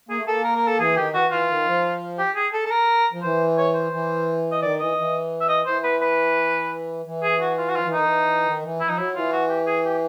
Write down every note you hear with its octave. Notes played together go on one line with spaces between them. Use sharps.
A#3 G#4
A3
A#3 A4
A#4
A#4
A4
E3 G#4
D#3 G4
E3 F#4
E3 F4
D#3
F3
G4
G#4
A4
A4
A#4
F3
E3 C5
C#5
C5
E3
D#5
D#3 D5
E3 D#5
E3
E5
D#5
E3 C5
B4
B4
E3
G#4
F#4
F4
F#4
F3 F4
E3
D#3 D#4
E3
D#3
E3
E4
F3 D#4
F#3 E4
E3 F4
F#4
G4
G#4
G4